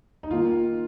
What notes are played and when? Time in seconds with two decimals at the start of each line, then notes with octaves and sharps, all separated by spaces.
0.23 D#4
0.31 D#3 A#3 F4